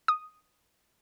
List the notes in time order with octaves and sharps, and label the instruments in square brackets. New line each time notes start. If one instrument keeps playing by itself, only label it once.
[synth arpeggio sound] D#6